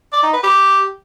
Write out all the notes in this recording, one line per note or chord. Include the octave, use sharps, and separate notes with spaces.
D5
D#4
B4
G4